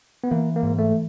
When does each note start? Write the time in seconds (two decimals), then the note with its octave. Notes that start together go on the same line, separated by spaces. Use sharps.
0.24 B3
0.31 E3 A#3
0.56 A#3
0.63 G#2
0.79 A3